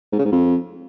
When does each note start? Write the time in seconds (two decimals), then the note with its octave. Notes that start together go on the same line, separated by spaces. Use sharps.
0.12 G#2
0.19 C#3
0.25 G#2
0.32 F2